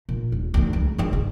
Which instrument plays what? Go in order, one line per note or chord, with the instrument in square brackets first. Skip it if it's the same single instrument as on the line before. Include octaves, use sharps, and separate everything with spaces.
[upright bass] A#2
D#1
D2 E3
C#2
D#3 G#3
G2 D#3